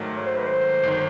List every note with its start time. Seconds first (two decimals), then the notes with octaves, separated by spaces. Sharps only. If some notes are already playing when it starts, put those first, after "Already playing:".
Already playing: G#2 D#3 F#3 A3
0.16 C#5
0.25 C5
0.36 B4
0.46 C5
0.83 G1 D#3